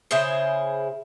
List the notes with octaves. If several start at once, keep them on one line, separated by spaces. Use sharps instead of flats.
C#3 E4 G#4 C5